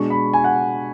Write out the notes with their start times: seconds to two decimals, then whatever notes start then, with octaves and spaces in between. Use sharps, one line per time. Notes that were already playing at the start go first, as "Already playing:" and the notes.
Already playing: B2 G#3 D4 C#6
0.10 B5
0.33 G#5
0.44 F#5